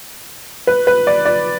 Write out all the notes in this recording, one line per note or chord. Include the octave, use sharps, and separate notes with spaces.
B4
B4
D5
D5